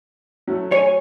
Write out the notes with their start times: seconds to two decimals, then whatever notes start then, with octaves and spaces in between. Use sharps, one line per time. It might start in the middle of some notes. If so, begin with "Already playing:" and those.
0.47 F#3 A3
0.72 C#5 G#5